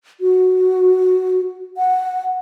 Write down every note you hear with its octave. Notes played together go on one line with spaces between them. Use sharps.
F#4
F#5